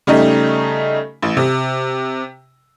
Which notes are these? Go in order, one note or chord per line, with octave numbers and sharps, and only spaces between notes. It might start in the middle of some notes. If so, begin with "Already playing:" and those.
C#3 G3 A3 D#4
A1
C3